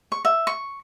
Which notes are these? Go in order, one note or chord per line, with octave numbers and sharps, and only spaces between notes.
C#6
E5
C#6